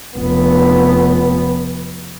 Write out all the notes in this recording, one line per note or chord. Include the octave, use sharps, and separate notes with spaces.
F1 B3